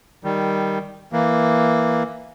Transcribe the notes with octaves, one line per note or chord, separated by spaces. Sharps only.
D#3 G3
E3 A#3